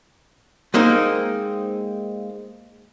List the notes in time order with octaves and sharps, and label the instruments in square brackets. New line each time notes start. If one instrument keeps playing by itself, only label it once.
[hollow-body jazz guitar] G#3 A#3 C4 D#4